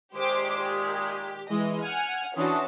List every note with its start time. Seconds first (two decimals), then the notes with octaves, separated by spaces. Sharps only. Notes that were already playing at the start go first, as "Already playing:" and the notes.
0.15 A#2 D#3 G#3 G4 C5 D6
0.60 G4
1.50 E3 G#3 D#5
1.82 F#5 G#5 F6
2.36 E3 C#4 D4 E4 F#4 A5 C6 D#6